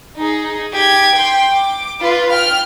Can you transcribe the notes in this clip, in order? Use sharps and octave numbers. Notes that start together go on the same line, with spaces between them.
D#4 G#4
G4 G#6
G5 C6
D6
F4 B4
G5 F6